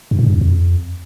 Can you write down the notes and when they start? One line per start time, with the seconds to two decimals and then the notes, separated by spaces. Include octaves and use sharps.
0.11 G2
0.19 A2
0.26 G2
0.34 E2
0.41 F2